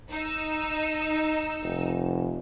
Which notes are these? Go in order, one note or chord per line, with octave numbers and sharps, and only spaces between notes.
D#4 E6
F1